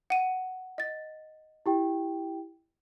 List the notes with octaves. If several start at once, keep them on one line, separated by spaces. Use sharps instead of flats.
F#5 D#7
D#5 A6
E4 G4 G5